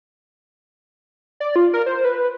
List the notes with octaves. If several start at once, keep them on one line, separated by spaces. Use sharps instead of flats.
D5
F4
A#4
C5
B4